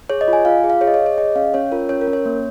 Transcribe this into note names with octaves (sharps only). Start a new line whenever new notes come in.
G#4 C#5
D#5
F4
G#5
F4 F5
G#4
F5
G#4 C#5
D#5
C#5
G#4
C#5
G#4 D#5
C#4 F5
C#4 C#5
F4 A#4
C#4 C#5
A#4
C#4
C#5
A#3